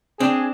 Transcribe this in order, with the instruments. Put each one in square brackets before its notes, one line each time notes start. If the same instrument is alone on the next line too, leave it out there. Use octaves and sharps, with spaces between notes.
[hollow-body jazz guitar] C4 D4 [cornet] G#4